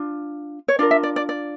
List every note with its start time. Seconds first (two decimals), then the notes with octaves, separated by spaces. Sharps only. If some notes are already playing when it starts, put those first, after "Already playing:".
Already playing: D4 F4
0.68 C#5
0.79 D4 F4 A#4 D5
0.91 E5
1.03 D5
1.16 D5
1.29 D5